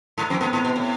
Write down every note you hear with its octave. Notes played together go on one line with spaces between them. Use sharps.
G#2
F2 C4
G#2 B3
G#2
B2
A2